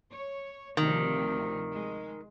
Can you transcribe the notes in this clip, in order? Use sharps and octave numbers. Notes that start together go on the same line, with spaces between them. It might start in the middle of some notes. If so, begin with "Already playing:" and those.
C#5
D2 C3 D#3 F3
G#3